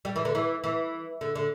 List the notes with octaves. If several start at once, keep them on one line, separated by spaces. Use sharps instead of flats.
G3
E3
D3
E3
E3
D3
D3